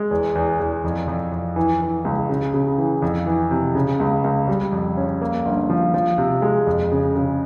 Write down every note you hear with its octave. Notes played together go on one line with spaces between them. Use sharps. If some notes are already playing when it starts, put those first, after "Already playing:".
Already playing: G#3
E2
E2
E2
F2
F2
F2
E3
E3
C#2
C#3
C#3
E3
F2
E3
C3
C#3
C#2
C#2
G3
F2
C#4
A#3
G1
F3
F3
C3
G#3
F2
C#3
C#3